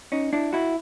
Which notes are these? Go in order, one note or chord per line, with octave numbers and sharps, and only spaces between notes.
C#4 D#4
D4 E4
E4 F#4